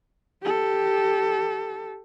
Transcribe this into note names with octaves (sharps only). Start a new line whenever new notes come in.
G4 A4